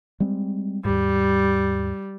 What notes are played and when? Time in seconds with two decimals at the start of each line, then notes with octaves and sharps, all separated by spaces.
0.20 G3 G#3 C4
0.85 D#2 G#2 G3